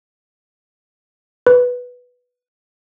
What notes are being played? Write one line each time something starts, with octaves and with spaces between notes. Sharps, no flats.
B4